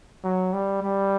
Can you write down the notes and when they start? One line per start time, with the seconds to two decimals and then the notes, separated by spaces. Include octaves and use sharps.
0.24 F#3
0.53 G3
0.83 G3